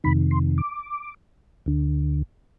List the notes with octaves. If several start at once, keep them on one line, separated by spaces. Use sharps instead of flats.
F2 C3 D#3 B5
C6
D6
D2 D3